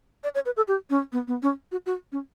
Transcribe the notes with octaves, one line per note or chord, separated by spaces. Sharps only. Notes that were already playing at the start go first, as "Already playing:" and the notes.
D5
C#5
B4
A4
G4
C#4
B3
B3
C#4
F#4
F#4
C#4